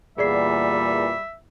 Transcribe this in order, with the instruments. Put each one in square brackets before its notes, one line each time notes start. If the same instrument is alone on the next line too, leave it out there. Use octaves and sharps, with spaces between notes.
[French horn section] E2 A#2 [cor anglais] G3 [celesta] G#4 D5 C7 [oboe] E5